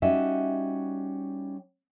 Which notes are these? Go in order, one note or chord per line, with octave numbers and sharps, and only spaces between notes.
G3 C#4 D#4 F#4 E5